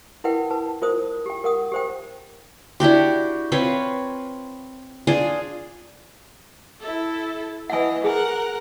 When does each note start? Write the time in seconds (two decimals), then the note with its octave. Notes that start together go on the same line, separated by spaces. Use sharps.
0.24 E4 A#4 B4 F#5 G5
0.50 B4 A5
0.82 F4 A#4 C5 D#6
1.26 G4 G5
1.44 A#4 F#5 D#6
1.72 G4 C5 G5
2.80 D4 E4 F#4 G4
3.52 C4 F4 B4 C#5
5.07 D4 F4 G#4
6.81 E4 A4
7.70 E3 D#5 F#5 G#5
8.04 G#4 A#4 F#5 G#5